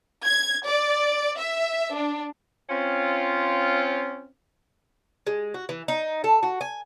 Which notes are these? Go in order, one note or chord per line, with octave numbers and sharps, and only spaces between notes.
G#6
D5
E5
D4
C4 C#4 F4
G#3
F#4
E3
D#4
A4
F#4
G#5